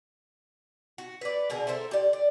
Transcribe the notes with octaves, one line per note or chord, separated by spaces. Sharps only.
F#4
B4 D5
B2 D3 G#4 A#4
A4 A#4 C5 E5
G4 D5
D5